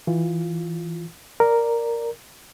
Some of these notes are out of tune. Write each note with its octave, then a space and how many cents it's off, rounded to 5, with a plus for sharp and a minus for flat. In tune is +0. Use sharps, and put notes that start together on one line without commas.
E3 +0 F4 +0
A#4 -5 D5 +0